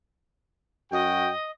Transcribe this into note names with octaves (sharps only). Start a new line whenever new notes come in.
F#2 F#4 D#5 G5